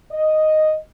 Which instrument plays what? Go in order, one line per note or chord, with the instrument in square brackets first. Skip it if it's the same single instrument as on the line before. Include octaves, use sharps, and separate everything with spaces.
[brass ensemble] D#5